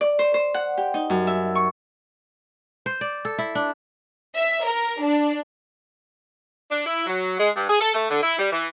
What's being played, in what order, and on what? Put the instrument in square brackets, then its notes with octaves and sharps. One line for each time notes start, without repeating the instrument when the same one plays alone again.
[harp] D5
C5
C5
F#5
G4
D#4
F#2
E5
C#6
[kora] C5
D5
A4
E4
D4
[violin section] E5
A#4
D4
[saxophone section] D4
E4
F#3
G#3
G2
G#4
A4
A3
D3
E4
G3
E3